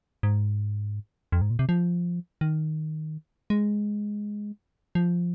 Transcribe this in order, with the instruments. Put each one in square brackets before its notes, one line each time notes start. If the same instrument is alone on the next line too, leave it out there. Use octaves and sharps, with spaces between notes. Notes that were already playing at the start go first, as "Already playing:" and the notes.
[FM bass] G#2
F2
G#2
A#2
C3
F3
D#3
G#3
F3